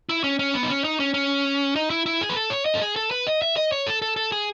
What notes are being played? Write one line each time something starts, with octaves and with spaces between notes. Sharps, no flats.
E4
C#4
C#4
B3
D#4
C#4
D#4
C#4
C#4
D#4
E4
E4
G#4
B4
A4
C#5
D#5
A4
G#4
A4
B4
D#5
E5
D#5
C#5
A4
A4
A4
G#4